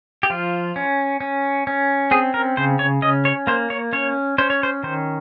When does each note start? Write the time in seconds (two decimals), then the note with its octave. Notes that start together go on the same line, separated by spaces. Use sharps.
0.23 G4
0.30 F3 F4
0.76 C#4
1.21 C#4
1.67 C#4
2.11 C4 G#4
2.34 A#4
2.57 C#3 C5
2.79 C#5
3.02 C#4 D#5
3.25 C#5
3.47 A#3 C5
3.70 C#5
3.93 C#4 C#5
4.38 C#4 C5
4.50 C#5
4.63 C5
4.83 D#3 C5